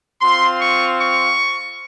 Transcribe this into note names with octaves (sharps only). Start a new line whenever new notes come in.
C4 F4 C6
C#6
C#6